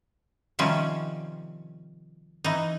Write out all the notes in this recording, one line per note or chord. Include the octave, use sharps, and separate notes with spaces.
C3 D#3 F3 G3 C4 C#4
E3 D#4